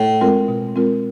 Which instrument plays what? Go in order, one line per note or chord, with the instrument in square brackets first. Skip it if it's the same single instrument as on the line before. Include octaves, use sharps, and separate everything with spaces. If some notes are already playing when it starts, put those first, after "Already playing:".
Already playing: [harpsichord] A2
[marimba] G#3 C4 F4 A#4
B2
G#3 C4 F4 A#4